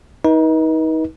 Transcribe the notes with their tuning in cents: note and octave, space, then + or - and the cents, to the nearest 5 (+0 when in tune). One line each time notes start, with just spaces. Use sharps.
D#4 +30 B4 -40